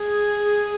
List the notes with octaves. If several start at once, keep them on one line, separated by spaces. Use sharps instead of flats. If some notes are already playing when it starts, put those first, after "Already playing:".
Already playing: G#4